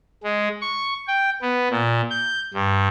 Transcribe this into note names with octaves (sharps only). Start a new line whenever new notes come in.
G#3
C#6
G5
B3
A#2
G6
G2